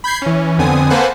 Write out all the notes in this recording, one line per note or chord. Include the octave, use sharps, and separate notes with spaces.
B5 G6 G#6 C7
E3 C#4
F2 D3 B3 C4 G#5 D#6
A#3 A4 B4 C5 F#5 G#5